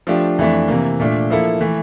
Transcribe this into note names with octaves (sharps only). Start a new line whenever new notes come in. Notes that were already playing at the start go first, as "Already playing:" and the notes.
F3 A3 D4 G4
F2 E3 A3 D4
C3 E3 A#3
A#2 A3 D4
F3 A#3 E4 A4
E3 A3